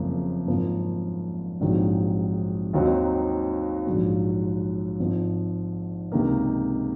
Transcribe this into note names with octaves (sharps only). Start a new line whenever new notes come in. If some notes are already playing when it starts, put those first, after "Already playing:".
Already playing: F#1 F2 C#3 F3 A#3
G#1 F#2 F3 A#3
A#1 G#2 D#3 F#3 C4
D#2 D#3 F#3 C4 D#4
A#1 G#2 F#3
G#1 G#2 F3
C#2 C3 D#3 A#3